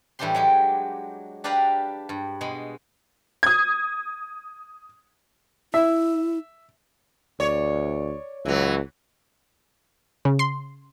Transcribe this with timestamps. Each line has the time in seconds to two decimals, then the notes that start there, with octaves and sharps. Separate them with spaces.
0.19 A2 E3 G3 D4 G4 C6
0.34 F#3 G#3 G4
1.44 D4 G4 B4 D5 F5 A#5
2.09 G2
2.41 B2 G#3 B5
3.43 D#6 G#6
5.74 E4 E5
7.40 D2 C#5 D5
8.45 C#2 E3 F#3
10.25 C#3
10.39 C6